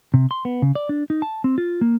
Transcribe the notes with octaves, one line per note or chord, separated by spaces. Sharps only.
C3
C6
B3
C#3
D5
D4
D#4
A5
C4
F4
A#3